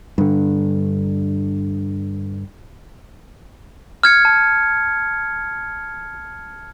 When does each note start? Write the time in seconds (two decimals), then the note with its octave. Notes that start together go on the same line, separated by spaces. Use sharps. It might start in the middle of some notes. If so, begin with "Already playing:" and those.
0.18 G2 D3
4.03 F6 G#6 C#7
4.25 A5